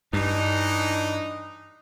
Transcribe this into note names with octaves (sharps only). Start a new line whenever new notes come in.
G2 E3 D4 D#4